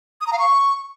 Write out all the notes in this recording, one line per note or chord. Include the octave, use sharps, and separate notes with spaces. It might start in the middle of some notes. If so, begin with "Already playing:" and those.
D#6
A#5
F5
C#6